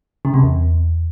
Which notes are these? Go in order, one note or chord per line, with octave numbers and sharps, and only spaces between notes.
C#3
C3
E2